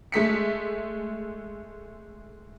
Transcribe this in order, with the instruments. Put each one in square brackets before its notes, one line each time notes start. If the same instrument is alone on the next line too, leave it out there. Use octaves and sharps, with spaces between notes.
[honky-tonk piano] G#3 A3 B6 C#7